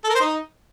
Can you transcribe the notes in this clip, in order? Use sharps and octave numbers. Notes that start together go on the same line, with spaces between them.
A4
A#4
C5
D#4